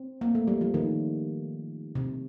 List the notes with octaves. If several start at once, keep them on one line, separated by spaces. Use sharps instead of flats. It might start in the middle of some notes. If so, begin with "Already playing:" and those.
Already playing: C4
A#3
A3
G3
F3
D#3
C3